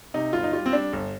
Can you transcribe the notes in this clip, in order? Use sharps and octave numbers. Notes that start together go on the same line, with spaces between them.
C3 D#4
G1 F4
D#4
G3 F4
C4
G3 D4
G1